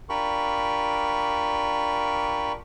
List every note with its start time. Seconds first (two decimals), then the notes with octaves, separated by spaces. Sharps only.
0.09 D4 F4 G4 A#4 B5 C#6